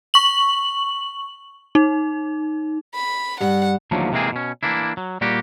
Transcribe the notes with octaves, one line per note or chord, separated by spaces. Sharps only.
C#6 F#7
D#4
B5
G2 F#5
D#2 D3 F3 F#3 A3 A#3
C3 E3 G#3 A#3 C4 G#4
B2 C#4
E3 A#3 D4 E4
F#3
A#2 G3 A#3 F#4 G4